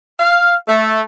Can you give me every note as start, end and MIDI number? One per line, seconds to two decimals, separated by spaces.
0.19 0.54 77
0.68 1.01 57